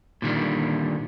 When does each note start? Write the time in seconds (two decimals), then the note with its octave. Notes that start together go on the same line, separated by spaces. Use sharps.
0.22 A#2 D3 D#3 G3